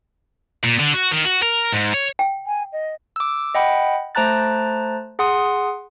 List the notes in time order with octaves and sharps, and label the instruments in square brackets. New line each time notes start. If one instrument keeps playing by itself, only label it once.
[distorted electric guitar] A#2
D3
F#4
D#3
F#4
A#4
G#2
C#5
[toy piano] G5
[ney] G#5
D#5
[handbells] D6 E6
D#5 F#5 G5 B5
A3 C5 A5 A#5 F#6 A6
G#4 F#5 C6 D#6